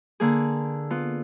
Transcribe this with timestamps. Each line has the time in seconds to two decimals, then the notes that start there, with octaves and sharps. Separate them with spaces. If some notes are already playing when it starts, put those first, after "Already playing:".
0.20 D3 A#3 G#4
0.90 B3 F4